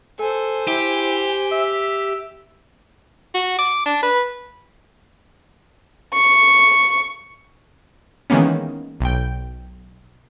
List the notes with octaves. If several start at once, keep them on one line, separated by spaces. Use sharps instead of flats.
A4 C5 G#5
E4 G4
E5
F#4
D6
D4
B4
C#6
D#3 E3 G#3 A#3 B3 C#4
B1 G5